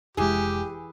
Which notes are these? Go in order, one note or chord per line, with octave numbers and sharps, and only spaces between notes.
F1 E3 G#3 G4 G#4